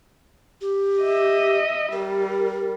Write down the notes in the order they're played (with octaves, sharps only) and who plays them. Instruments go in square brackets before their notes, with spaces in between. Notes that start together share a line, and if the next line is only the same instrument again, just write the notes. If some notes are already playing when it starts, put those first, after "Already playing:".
[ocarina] G4
[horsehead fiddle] D#5 E5
[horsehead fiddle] G3 [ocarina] A#4